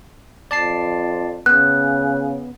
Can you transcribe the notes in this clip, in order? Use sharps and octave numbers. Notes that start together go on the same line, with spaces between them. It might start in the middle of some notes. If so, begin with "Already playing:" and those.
F2 D5 A5 C7
C#3 B3 F#6